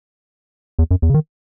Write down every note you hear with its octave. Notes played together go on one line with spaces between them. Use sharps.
E2
F#2
E2
C#3
D#3